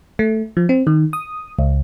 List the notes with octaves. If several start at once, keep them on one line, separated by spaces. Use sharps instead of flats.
A3
F3
C4
D#3
D#6
C#2